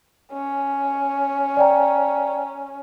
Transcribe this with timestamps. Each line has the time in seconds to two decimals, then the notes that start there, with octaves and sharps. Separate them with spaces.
0.33 C#4
1.57 D5 G5 A#5